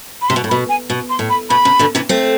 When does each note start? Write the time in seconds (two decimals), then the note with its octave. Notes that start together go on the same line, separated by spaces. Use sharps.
0.22 B5
0.29 C3 C6
0.36 B2
0.44 A2
0.49 B2 B5
0.69 G#5
0.90 B2
1.10 C6
1.19 A2
1.30 B5
1.50 B2 B5
1.65 C3
1.79 B2 D3
1.95 C3 E3
2.09 A3 C4